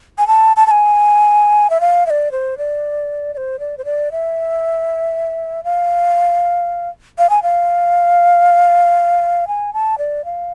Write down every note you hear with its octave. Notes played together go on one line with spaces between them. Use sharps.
G#5
A5
A5
A5
G#5
E5
F5
E5
D5
C5
D5
D5
C5
D5
C5
D5
E5
F5
F5
G#5
F5
G#5
A5
D5
F5